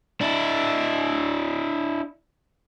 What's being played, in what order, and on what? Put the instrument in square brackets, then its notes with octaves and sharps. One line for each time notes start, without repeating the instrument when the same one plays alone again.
[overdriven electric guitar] D4 E4